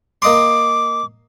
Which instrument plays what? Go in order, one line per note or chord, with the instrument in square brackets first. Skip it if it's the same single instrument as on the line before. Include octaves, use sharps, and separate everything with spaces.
[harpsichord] A#3 D#5 C6 [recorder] D6